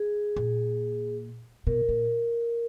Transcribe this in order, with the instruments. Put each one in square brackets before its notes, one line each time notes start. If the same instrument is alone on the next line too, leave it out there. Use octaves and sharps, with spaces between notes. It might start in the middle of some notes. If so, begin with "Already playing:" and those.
Already playing: [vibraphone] G#4
[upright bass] A#2
[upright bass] B2 [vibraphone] A#4
[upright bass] A#2